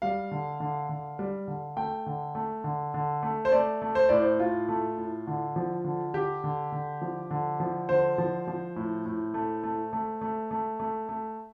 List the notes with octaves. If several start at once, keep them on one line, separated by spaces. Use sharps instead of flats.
G3 F5
D3
D3
D3
G3
D3
A3 G5
D3
A3
D3
D3
A3
C5
A3 D5
A3
C5
A2 D5
C5
A2 F4
A3
A2
D3
F3
D3
D3 G4
D3
D3
F3
D3
F3
D3 C5
F3
F3
A2
A2
A3
A3
A3
A3
A3
A3
A3